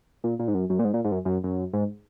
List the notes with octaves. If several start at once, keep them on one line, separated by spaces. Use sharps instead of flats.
A#2
A#2
G#2
F#2
F#2
A#2
G#2
A#2
G#2
F#2
F#2
F#2
G#2